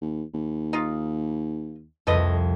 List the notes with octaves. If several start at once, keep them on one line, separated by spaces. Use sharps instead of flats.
D#2
D#2
D#4 F4
C2 F2 A4 B4 D#5